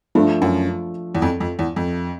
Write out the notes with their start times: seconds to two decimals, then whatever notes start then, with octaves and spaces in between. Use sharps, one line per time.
0.15 G2 F3 A3 D4
0.42 F#2
1.15 E2
1.22 F2
1.40 F2
1.59 E2
1.76 F2